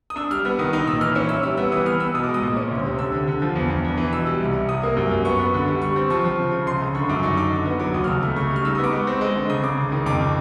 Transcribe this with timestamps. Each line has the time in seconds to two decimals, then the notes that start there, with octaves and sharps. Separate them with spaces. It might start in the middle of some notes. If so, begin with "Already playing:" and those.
0.10 D#6
0.16 D4 E6
0.30 G3 F6
0.45 B3 E6
0.59 D#3 D#6
0.73 D#4 D#6
0.87 A#2 E6
1.01 E3 F6
1.15 C#4 E6
1.29 E4 E6
1.43 G3 E6
1.57 B3 E6
1.72 E3 D#6
1.85 B3 F6
2.00 B3 E6
2.14 B2 D#6
2.24 G#3 D6
2.34 D#6
2.43 A#2
2.57 C#4
2.71 D2
2.85 C3
2.99 D3 E6
3.13 D3
3.27 D3
3.42 F3
3.55 E2
3.70 E2
3.84 D4
3.97 E3
4.13 B2 E6
4.26 G3
4.41 C2
4.54 C2
4.69 C3 D#6
4.83 A#3
4.97 F#2
5.11 F#2
5.25 B3 C#6
5.39 B3
5.54 D3
5.67 G3
5.82 G3 C#6
5.96 C4
6.10 F3 C#6
6.24 F3
6.39 C#3
6.52 C#3
6.67 C#2 C6
6.81 C#2
6.95 D3 C#6
7.09 F#2 D6
7.23 D#4 C#6
7.37 D#4 D6
7.52 D3
7.66 B3
7.79 F#3 D6
7.94 D#2 D#6
8.04 F6
8.08 C#2 E6
8.22 A3 F6
8.36 C#3 C#6
8.51 G3
8.56 F6
8.65 D#4 E6
8.75 B3 D#6
8.84 D6
8.93 G#3 C#6
9.07 C4
9.21 G#3
9.35 D3
9.49 C#3 D#6
9.64 C#3 D6
9.78 C#2
9.92 D#3
10.06 F2 D6
10.19 C#3